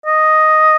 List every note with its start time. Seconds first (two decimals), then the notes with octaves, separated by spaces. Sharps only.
0.06 D#5